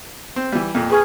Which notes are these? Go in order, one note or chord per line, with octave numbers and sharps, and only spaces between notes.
C4
E3 G3
F2 A#2
G#4 B4 C#6 F6